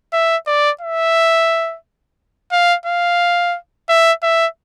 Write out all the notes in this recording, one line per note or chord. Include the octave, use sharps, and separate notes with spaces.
E5
D5
E5
F5
F5
E5
E5